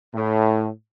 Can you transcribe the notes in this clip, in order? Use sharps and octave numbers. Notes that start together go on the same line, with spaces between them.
A2